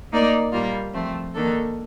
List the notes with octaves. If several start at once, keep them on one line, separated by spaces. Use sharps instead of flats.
A#3 D#4 A#4 D5
A#2 G3 A#3 F4
F3 A3 C4
D#3 A#3 D4 A4